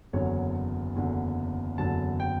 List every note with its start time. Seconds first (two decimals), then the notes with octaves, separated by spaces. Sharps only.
0.13 F#1 E2 D3 F#3 C#5
0.96 F#1 E2 D3 F#3
1.78 F#1 E2 D3 F#3 A5
2.20 G5